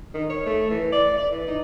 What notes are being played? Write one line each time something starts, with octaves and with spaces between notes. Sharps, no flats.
D#3
C#5
A3
E3
D5
D5
E3
D#4